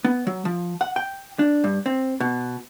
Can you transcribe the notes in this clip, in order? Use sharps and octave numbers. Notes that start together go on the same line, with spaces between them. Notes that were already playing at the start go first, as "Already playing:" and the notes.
B3
F#3
F3
F#5
G5
D4
G2
C4
B2